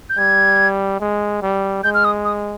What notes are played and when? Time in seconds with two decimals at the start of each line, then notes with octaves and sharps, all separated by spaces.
0.10 G6
0.18 G3 G#6
1.00 G#3
1.42 G3
1.84 G#3 G6
1.94 F6
2.05 D#6
2.25 D#6